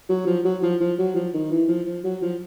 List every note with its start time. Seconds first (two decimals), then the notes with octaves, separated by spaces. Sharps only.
0.09 F#3
0.27 F3
0.45 F#3
0.62 F3
0.80 F3
0.98 F#3
1.15 F3
1.34 D#3
1.51 E3
1.68 F3
1.86 F3
2.04 F#3
2.22 F3